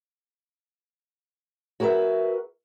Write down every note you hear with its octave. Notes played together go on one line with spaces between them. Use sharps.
F#4 G#4 A#4 B4 E5